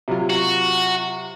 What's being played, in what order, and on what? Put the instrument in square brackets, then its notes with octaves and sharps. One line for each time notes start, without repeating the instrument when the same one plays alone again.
[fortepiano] C3 F#3 F4
[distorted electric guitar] F#4